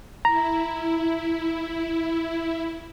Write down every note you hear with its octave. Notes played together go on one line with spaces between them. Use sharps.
E4 A#5